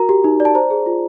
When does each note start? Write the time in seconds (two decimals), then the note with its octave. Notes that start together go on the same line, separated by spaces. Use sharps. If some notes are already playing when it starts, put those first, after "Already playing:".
Already playing: F#4 A#4 A#5
0.09 G4
0.24 D#4
0.40 D5
0.45 A5
0.55 C5 A#5
0.71 G#4
0.86 F4